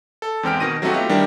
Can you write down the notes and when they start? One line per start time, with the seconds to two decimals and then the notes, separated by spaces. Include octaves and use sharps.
0.22 A4
0.43 E2 G#2 C4 G5 F6 D7
0.60 B2 D#3 A#6 D#7
0.82 F#3 A3 C4 D#4 F#4 G4
0.94 A3 B3 F4 G4
1.09 D#3 G3 D4 E4 G4 A#4